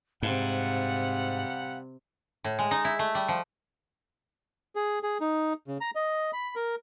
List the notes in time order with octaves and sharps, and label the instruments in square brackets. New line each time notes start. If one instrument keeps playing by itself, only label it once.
[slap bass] G#2 [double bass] C3 [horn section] G3 F#5 [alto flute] F5
[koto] A2
G#3
D#4
E4
A3
G3
F3
[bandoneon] G#4
G#4
D#4
C#3
A#5
D#5
B5
A#4